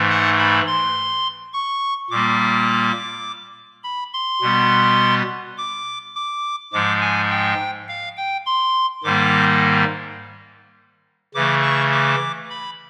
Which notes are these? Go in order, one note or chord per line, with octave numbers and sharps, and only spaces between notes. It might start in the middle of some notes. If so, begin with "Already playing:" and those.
Already playing: G#2 E3 A3
F#5
B5
C6
C#6
A#2 G3 A#3 D6
B5
C6
B2 G3 B3
D6
D6
G#2 F3 G#3 D6
G#5
G5
F5
G5
C6
G#2 D#3 G3 A#3 D6
C#3 E3 A3 D6
C#6
D6
B5